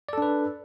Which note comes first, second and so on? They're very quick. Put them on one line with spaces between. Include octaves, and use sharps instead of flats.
D5 A4 D4 B4